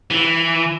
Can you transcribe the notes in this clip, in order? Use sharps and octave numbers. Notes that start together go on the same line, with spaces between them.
E3